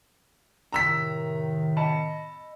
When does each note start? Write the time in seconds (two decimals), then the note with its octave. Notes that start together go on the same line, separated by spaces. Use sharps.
0.72 A2 C3 D#3 A#5 E6 B6
1.77 D#5 A5 B5